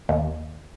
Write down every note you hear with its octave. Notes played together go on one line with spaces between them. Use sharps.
D#2